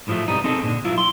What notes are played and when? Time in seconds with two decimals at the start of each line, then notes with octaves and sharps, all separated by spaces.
0.08 A2 F3 F#3 G#3 A3
0.28 C2 F#2 B2 G3 D#4
0.44 C4 D#4 G#4 A4
0.64 A#2 D3
0.85 F#3 E4 F4
0.98 C6